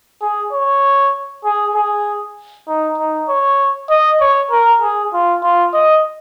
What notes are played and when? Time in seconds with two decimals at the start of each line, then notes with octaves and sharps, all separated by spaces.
0.22 G#4
0.52 C#5
1.44 G#4
1.75 G#4
2.68 D#4
2.98 D#4
3.29 C#5
3.90 D#5
4.21 C#5
4.51 A#4
4.82 G#4
5.13 F4
5.43 F4
5.74 D#5